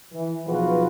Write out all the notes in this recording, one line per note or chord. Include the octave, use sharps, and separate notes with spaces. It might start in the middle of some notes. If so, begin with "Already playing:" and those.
E3
B1 F3 F4 F#4 G#4 B4